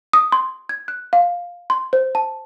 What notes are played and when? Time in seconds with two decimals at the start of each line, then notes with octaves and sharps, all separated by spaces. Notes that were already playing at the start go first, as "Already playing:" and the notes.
0.13 D#6
0.32 C6
0.69 G#6
0.88 F#6
1.13 F5
1.70 C6
1.93 C5
2.15 A5